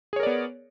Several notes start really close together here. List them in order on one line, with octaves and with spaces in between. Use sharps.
G#4 C#5 A#4 D5 B3